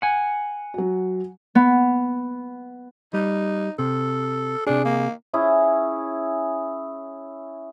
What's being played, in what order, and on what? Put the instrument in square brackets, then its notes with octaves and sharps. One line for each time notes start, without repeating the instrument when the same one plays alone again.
[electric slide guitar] F#5 G#5
[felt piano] F#3 F#4
[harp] B3
[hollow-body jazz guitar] G3 [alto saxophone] D#4
[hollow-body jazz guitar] C3 [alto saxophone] A4
[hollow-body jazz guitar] C3 G#4 [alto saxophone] D4
[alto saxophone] A#3
[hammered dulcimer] C#4 E4 G#4